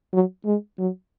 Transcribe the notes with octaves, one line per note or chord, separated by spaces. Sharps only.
F#3
G#3
F#3